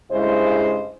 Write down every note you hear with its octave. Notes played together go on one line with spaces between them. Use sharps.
G2 C#3 G#3 E4 C5 D#5